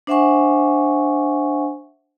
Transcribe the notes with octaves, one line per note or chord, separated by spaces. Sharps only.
D4 C5 E5 F#5 G#5 C#6